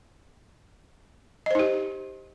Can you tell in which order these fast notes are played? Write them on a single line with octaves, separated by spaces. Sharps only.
D#5 C5 D#4 G4